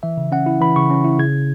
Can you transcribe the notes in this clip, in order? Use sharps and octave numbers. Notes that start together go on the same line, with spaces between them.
E3 E5
C#3
C#4 F#5
E4
E3 B5
C#3 C#6
C#4
E4
C#3 G#6